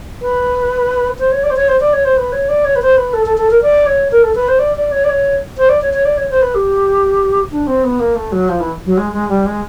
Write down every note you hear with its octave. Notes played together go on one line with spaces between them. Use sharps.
B4
C5
C#5
D5
C5
C#5
C5
D5
C#5
C5
B4
C#5
D5
C#5
B4
C5
B4
A4
A4
A4
A#4
D5
C#5
A#4
A4
B4
C5
D5
D5
C#5
D5
C#5
C5
D5
C#5
C#5
D5
C#5
C5
B4
G4
D4
C4
B3
A#3
A3
F#3
F3
E3
F#3
G#3
G#3
G3
G#3